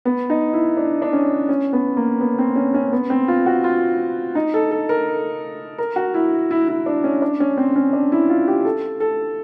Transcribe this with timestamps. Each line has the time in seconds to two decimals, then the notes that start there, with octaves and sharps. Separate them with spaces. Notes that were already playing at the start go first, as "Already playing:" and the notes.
0.05 B3
0.30 D#4
0.53 E4
0.77 D4
1.02 D4
1.13 C#4
1.49 C#4
1.73 B3
1.97 A#3
2.21 B3
2.39 C4
2.56 C#4
2.74 C#4
2.93 B3
3.10 C4
3.28 F4
3.46 F#4
3.64 F4
4.35 D#4
4.54 A4
4.71 A4
4.89 A#4
5.78 A#4
5.96 F#4
6.14 E4
6.51 E4
6.68 E4
6.86 D4
7.04 C#4
7.22 D4
7.40 C#4
7.57 C4
7.76 C#4
7.93 D4
8.12 E4
8.29 F4
8.48 G4
8.65 A4
9.00 A4